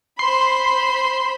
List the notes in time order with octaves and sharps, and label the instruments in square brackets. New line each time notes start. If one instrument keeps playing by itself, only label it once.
[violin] C5 B5 [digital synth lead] C6